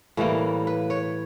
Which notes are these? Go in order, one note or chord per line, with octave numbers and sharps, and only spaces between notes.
A2 E3 G3 A#3
B4
C#5